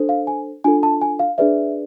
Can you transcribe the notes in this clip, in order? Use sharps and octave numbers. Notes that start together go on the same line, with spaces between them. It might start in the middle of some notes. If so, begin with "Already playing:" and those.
Already playing: D4 A4 C5
F5
G#5
D4 F4 A4 G#5
A5
G#5
F5
D4 G#4 B4 D5 E5